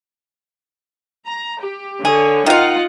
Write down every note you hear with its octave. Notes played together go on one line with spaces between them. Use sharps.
A#5
G4
D3 G#4 C#5
D#3 D#4 F4 F5 F#5